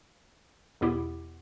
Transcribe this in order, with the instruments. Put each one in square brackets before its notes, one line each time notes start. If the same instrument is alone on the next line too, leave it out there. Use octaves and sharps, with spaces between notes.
[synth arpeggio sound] E2 B2 B3 E4 G4